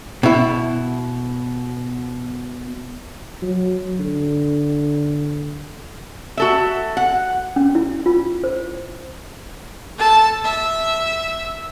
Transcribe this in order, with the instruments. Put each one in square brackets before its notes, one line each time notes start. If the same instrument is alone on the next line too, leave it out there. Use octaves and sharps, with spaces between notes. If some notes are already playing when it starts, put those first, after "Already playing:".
[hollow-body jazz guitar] B2 E4
[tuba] F#3
D3
[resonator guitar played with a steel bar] F#4 A4 E5
F#5
[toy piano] C#4
E4
F4
C5
[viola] A4 A5
E5